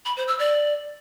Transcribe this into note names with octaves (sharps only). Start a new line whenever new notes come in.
B5
C5
E6
D5